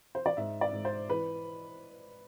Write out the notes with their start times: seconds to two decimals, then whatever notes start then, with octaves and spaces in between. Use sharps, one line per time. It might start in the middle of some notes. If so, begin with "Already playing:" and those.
0.15 C5
0.26 D5
0.37 G#2 E5
0.61 D5
0.72 G#2
0.85 C5
1.09 E3 B4